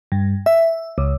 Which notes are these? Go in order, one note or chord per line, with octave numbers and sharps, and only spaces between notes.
G2
E5
C#2